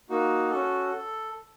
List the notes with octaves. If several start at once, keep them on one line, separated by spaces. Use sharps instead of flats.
A#3 D#4 F#4
C#4 F#4 A4
A4